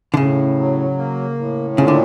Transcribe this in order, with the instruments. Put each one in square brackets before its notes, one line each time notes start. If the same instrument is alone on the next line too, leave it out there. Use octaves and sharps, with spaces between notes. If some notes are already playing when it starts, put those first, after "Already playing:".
[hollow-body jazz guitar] D3
[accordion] A2 [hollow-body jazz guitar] C#3
[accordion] F#3
A#3
A2
[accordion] A#2 [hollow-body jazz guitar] C#3
[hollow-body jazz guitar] D3